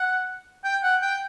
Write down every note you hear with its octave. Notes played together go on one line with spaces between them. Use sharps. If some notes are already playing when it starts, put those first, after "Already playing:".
Already playing: F#5
G5
F#5
G5